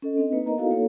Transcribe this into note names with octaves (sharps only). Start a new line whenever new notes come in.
C#4 A4 D#5
C4 D4 D#5
A#3 D#4 B4
B3 A#4 D#5 A#5
D#4 E4 F#4 A4 F5
A#3 D4 A4 C#5